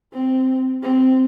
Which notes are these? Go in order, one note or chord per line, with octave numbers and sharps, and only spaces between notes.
C4
C4